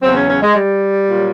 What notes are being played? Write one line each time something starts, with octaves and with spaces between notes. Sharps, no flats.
E2 C#3 F#3 C4
C#4
C#4
G#3
G3
A#2 F#3